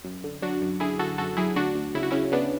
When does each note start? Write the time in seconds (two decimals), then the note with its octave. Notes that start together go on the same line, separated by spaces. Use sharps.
0.04 F#2
0.24 D3
0.42 F#3 D4 F#4
0.62 F#2
0.80 D3 E4 G#4
0.99 D3 F#4 A4
1.18 F#2 F#4 A4
1.37 F#3 E4 G#4
1.56 D2 D4 F#4
1.75 D2
1.95 C#3 E4
2.03 F#4
2.11 C#3 C#4 E4
2.32 C#3 B3 D4